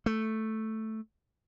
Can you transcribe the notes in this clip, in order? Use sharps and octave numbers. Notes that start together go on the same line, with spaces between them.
A3